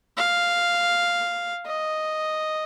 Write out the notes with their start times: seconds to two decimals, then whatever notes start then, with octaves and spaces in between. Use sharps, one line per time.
0.18 F5
1.66 D#5